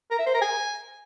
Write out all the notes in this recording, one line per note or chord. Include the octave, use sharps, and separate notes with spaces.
A#4
E5
C5
A#4
G#5